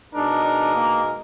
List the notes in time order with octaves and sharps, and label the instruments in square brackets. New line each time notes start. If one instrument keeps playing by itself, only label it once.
[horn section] B2 G#3 D#4 A#4 [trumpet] D4
[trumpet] D4
A#3